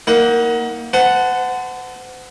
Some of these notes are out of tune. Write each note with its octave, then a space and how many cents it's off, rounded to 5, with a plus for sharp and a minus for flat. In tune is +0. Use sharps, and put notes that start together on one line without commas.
A#3 +0 D#4 +35 F#5 +0
C5 -40 F#5 +0 A5 +5